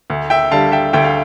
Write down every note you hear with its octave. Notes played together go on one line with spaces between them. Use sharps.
D2
E5 G5
D3 G3 F5 A5
E5 G5
D2 E5 G5
F5